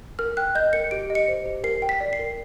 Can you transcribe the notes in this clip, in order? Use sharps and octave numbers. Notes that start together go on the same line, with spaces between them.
A#4 F6
G5 F#6
D#5 G6
A#4 C#7
G4 D7
D#5
C#7
C5
G4
A#4 C7
G5
B6
D5
C7
A#4